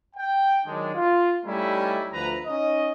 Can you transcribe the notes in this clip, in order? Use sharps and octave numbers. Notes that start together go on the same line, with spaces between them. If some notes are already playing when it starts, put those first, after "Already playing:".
G5
D#3 F#3 G#3 D4
F4
G3 A3 C#4 D#4 E4
D2 F3 B4 A#5
C#4 D#4 D#5